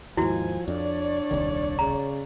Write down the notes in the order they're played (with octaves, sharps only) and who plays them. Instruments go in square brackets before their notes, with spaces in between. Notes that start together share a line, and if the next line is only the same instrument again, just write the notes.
[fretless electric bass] D#2 G#2 [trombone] F3 [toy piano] E4 F#4 [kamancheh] G#5
[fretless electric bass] F2 [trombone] D4 [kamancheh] C#5 D5
[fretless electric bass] D#1 C2 D#3
[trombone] C#3 [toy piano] A#5